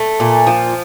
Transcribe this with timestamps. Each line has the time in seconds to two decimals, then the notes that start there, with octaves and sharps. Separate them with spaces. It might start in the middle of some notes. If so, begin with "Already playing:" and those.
Already playing: A3
0.20 A#2
0.47 F3